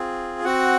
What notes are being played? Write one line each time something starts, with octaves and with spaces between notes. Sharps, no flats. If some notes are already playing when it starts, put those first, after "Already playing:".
Already playing: C4 F4 G#4
C4 F#4 F#5